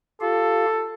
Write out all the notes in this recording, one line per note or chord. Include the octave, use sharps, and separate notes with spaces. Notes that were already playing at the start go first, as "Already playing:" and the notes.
F4 G4 A4 F5